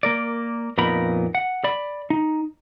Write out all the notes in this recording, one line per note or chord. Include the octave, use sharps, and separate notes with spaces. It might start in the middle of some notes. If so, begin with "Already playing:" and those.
A#3 A#4 D5
F2 A#2 B3 D#4 A#4 B5
F#5
D5 B5
D#4